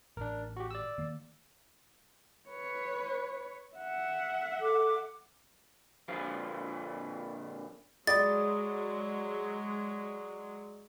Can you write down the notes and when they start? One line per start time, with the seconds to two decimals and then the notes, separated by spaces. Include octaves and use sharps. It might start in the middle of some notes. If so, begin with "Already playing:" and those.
0.17 A1 D4 A#4
0.56 F#4 G4
0.71 D5 E6
0.98 D#3 A#3
2.48 B4 C#5
3.76 E5 F#5
4.60 A4 D6
6.08 A#2 D3 F3 C5 F5
8.07 F#3 G#3 G#4 D5 B5 D#6 A6